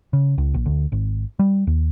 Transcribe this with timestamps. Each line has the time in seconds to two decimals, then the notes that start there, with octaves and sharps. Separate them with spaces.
0.13 C#3
0.38 C#2
0.54 A#1
0.66 D2
0.92 G#1
1.39 G3
1.67 D#2